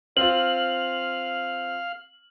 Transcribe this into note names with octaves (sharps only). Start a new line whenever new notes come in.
C4 F4 F5 F6 F#7